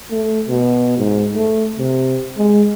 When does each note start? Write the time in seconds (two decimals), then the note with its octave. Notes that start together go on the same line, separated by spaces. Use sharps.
0.11 A3
0.48 B2
0.98 G#2
1.35 A3
1.78 C3
2.37 G#3